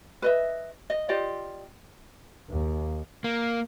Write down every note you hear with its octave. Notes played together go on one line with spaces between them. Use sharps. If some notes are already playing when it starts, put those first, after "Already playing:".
B4 D#5 E5
D#5
F4 G4 D5 D#5
D#2
A#3